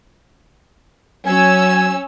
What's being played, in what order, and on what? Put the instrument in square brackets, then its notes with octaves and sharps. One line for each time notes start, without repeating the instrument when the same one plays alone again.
[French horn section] F#3 [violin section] C#4 E6 [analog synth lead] G#5